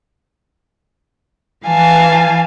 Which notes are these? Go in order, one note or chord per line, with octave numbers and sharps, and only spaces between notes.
E3 F5 G#5 A5